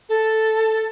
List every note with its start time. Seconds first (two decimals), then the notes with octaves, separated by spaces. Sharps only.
0.09 A4